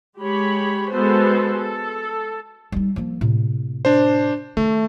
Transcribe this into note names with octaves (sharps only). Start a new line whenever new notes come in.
G#3 G4 C#5 B5
G#3 B3 F#4 A4 B4 C5
A4
G3 D#4
F3 A#3
A2 C3
D4 C5
D#3 A3